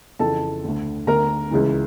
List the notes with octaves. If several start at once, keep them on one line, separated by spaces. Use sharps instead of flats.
F2 C#3 E3 A4 A5
D2 D3
D2 D3 A#4 A#5
C#2 C#3 E3